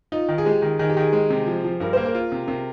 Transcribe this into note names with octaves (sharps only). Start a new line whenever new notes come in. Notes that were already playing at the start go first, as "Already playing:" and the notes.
D#4 F4
D#3
G#4
G#3 G4
D#3
D#3 G#4
G4
D#3 G#4
G#3
C3
F3
F3
G2 A#4
A#3 C5
A#4
F4
C3
C3 A#4